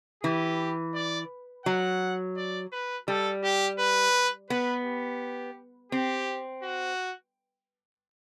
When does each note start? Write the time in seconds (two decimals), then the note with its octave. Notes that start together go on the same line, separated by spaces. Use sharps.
0.23 E3 G4
0.94 D5
1.66 F#3 F#5
2.37 D5
2.72 B4
3.08 G3 A4
3.44 G4
3.79 B4
4.50 B3 B4
4.85 G4
5.92 C4 G4
6.63 F#4